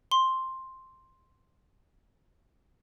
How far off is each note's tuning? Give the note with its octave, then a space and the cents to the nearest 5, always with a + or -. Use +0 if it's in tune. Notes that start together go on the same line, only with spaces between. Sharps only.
C6 +5